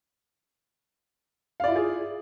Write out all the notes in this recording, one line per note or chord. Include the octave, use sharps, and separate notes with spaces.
E4 F4 G#4 D5 F5